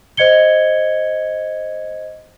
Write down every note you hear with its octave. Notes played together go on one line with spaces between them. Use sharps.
C5 D#5 G#6 C#7 G7